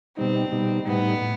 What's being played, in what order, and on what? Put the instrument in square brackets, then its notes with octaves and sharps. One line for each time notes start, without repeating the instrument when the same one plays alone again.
[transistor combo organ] B2 G3 D#4 [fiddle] C4
[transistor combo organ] B2 G3 D#4
[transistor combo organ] A2 G3 D#4 [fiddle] B3
[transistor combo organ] A2